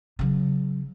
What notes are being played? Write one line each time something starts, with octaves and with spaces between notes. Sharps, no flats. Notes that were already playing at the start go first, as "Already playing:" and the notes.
C#3 F#3